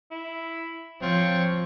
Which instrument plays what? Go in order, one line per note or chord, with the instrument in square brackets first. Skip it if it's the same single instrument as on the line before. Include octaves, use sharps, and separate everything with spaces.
[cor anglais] E4
[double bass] F3 [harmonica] C4 C#5 [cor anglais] F4